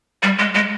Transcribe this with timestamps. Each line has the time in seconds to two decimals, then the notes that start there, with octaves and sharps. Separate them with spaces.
0.23 G3
0.39 G#3
0.55 G#3